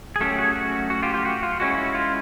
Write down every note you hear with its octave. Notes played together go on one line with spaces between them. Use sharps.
G#4
F#3 A3 C#4 G4 A4
F#4 G#4
F#4
F#4
F4 G4
F4 G4
F#4
F4
G#3 C#4 E4 F#4
F#4
F4